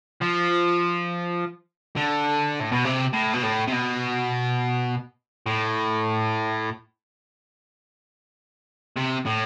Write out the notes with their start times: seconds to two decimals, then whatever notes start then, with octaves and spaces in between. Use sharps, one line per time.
0.22 F3
1.96 D3
2.60 A2
2.72 B2
2.85 C3
3.13 A2
3.33 B2
3.42 A2
3.67 C3
3.72 B2
5.47 A2
8.97 C3
9.26 A2